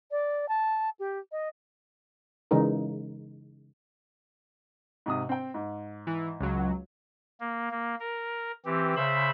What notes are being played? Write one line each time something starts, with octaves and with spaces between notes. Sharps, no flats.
D5
A5
G4
D#5
C#3 E3 G#3 D#4 A#4
G#2 C3 D#6
C4 G5
G#2
E3
C#2 F#3
A#3
A#3
A#4
E3 C4 G4
C#3 C5 E5 B5